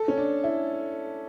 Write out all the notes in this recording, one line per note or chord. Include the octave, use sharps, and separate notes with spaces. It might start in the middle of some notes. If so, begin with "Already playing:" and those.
Already playing: A4
C#4
D4
E4